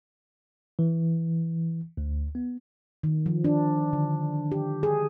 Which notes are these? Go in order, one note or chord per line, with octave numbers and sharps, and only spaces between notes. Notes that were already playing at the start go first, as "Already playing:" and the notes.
E3
D2
B3
D#3
F3
D4
D3
G4
G#4